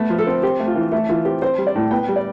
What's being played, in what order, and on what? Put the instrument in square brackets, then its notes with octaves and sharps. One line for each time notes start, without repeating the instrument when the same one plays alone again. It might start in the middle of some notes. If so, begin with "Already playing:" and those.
Already playing: [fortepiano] A3 B3
F3
A4
C4
C4 G4
A3
F4
E3
A3 E4
E3 F4
C4 G4
C4 C5
G3
D5
A2
B3 G5
G3
D5